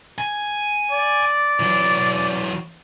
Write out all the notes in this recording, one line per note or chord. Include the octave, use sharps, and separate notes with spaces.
G#5
D5
E3 F#3